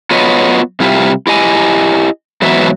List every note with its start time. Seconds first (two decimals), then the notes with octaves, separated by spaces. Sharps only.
0.11 F#3 B3 F4 B4 C#5 D#5
0.80 C3 G3 E4 F4 G4
1.27 E4 G4 D#5 G#5
2.42 G#2 E3 F#3 B3 F#4 E5